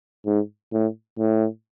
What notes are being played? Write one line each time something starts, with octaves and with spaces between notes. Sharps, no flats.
G#2
A2
A2